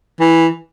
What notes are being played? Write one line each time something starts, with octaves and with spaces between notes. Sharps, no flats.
E3